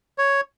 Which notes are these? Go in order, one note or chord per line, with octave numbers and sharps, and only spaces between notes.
C#5